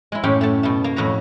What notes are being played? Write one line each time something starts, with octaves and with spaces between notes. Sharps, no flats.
G#3 E4
F#2 A2 C#4 G4 G5 C6
A3 A5
B2 A3
A#3
F2 A2 F#4 B4 A#5